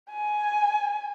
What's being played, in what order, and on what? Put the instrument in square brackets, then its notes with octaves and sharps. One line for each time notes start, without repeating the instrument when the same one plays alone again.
[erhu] G#5